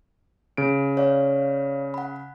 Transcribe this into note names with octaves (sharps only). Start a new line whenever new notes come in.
C#3 D7
C#5 D5 F5
F#5 B5